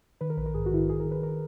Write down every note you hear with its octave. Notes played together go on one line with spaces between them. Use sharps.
D#3 B4
A#4
A#1 B4
A#4
G#2 G#4
F#4
D#3 E4
F#4
D#3 G#4
A#4
D#3
B4
D#3 A#4